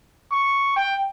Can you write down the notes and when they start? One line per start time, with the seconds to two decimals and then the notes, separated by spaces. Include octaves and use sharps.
0.31 C#6
0.76 G5